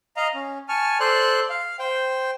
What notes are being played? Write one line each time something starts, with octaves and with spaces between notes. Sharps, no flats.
D#5 F5 A#5
C#4
G#5 A5 C#6 F6
A4 C5 D5 C6 F#6
F5
C5 G5